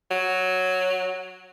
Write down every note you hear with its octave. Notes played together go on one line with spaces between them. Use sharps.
F#3